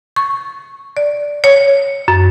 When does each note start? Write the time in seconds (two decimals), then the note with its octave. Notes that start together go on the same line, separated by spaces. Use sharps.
0.16 C#6
0.97 D5
1.44 C#5
2.08 F#2